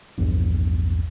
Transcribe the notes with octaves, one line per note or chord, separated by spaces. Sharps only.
A#1 E2 G2